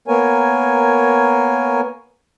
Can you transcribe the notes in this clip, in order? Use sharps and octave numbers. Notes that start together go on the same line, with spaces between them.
A#3 B3 A#4 C#5 G#5